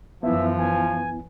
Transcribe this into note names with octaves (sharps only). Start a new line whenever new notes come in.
F#2 E3 F3 B3 E4 E5
G#5